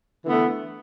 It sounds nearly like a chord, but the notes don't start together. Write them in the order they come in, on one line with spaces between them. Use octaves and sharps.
E3 D3 B3 A3